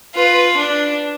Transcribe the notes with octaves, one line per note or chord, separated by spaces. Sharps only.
F4 B4
D4